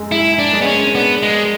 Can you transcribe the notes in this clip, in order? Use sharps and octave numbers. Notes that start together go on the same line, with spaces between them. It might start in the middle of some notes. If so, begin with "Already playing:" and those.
Already playing: F#2 G#3
G#3 E4
D4
G#3
B3
C#4
B3 D4
G#3